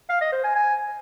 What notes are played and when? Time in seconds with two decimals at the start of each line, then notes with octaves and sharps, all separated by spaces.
0.10 F5
0.21 D#5
0.33 C5
0.44 G#5
0.55 G#5